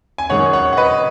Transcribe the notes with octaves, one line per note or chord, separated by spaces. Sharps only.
G#5
F#2 D#3 G#3 C#5 F#5
C#5 F#5
F#5
B4 D#5